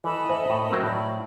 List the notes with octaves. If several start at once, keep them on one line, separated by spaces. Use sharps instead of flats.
E3 A4 D#5 B5
C5 E5 G#5
A2
F#3 C4 A#4
A2 D5 B5